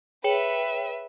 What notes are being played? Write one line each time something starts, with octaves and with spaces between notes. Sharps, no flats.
G#4 B4 C#5 E5 G5